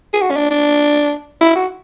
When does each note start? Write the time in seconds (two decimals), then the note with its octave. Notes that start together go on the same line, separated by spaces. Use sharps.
0.13 G#4
0.21 F#4
0.30 C#4
0.36 D4
0.50 D4
1.41 E4
1.55 F#4